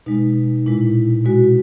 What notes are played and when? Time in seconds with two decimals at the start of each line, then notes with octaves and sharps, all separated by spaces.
0.06 B2 G#3 D#4
0.66 A#2 G#3 E4
1.25 B2 G#3 F#4